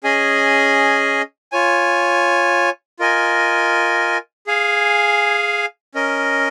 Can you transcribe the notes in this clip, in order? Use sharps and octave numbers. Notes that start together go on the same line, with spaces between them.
C#4 G#4 D#5 G#5
F4 C#5 G#5
F4 A#4 D#5 G#5
G#4 F5 G#5
C#4 A#4 D#5